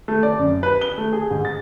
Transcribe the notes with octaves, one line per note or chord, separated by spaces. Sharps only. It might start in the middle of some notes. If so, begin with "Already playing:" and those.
A3
D5
F#2
B4
G7
A3
G#4
G#2
A6